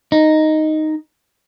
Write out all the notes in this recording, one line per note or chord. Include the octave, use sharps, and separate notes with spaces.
D#4